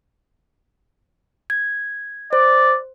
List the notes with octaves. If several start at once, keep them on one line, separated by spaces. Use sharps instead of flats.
G#6
C5 D5